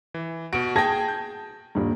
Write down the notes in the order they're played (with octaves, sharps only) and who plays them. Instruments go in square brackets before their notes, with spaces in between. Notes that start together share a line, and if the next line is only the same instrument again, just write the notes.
[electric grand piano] E3
[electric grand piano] B2 F#4 [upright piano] D7
[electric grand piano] G#4 G5 [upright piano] A5 G#6 A#6
[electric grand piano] G6
[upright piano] D#1 G2